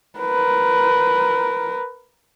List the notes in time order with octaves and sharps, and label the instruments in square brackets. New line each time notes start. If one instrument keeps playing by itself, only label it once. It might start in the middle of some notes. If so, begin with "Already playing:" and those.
[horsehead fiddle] A#4 B4